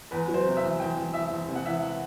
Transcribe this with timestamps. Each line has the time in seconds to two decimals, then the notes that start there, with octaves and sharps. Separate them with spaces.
0.11 E2 B4
0.28 F#3
0.34 C5
0.45 C3
0.57 E5
0.63 E2
0.80 E2 G5
0.96 E2
1.14 E2 E5
1.31 E2
1.48 C3
1.55 F#5
1.66 E3 E5
1.83 F#5